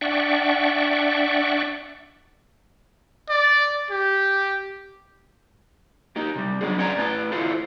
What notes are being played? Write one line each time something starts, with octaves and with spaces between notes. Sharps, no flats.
D4 D5 E5 F#5 G5 C#6
D5
G4
A#3 D#4 G4
C3 G3
F#3 B3 D4 G#4
C#4 D5 F#5 G#5 A#5
A2 B4 A5
E4 F4 A4 C5